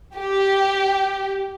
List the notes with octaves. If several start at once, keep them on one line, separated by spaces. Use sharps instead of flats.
G4